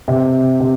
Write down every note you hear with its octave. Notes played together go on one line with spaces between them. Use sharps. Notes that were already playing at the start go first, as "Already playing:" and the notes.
C3
C3